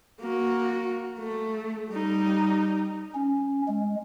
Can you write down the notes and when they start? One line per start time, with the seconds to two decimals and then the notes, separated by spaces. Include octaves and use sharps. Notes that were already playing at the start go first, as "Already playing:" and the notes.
0.21 A#3 F#4
1.19 A3
1.90 G3 D#4
3.15 C#4
3.68 G#3